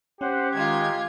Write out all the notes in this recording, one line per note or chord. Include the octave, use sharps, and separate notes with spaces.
C#4 G4 C5 F#5
D#3 G#3 F4 G#6